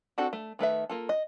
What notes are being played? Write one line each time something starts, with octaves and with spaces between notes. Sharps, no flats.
C4 D4 F#4 A4
A3
D#3 A3 B4 E5
A#3 F4 A4
D#5